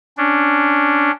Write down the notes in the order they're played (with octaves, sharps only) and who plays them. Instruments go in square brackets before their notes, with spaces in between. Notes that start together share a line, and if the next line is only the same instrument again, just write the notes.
[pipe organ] C#4 D4